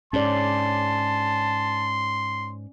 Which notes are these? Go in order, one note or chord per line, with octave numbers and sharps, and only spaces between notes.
G#2 C#4 D5 A5 C6